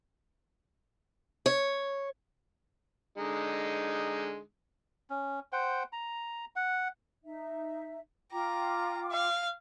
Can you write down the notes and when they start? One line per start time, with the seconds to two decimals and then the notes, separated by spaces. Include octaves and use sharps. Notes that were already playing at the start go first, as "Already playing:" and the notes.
1.46 C#5
3.16 D3 G#3 D#4
5.10 C#4
5.52 C5 F#5 G5
5.92 A#5
6.56 F#5
7.24 D#4 E5
8.32 F4 G5 A#5 D6
9.10 F5